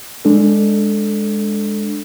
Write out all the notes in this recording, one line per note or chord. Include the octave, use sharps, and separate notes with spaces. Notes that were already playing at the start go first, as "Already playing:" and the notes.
G#3 D4 A4